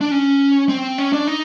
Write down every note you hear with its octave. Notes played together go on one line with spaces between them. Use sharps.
D4
C#4
C4
C#4
D4
D#4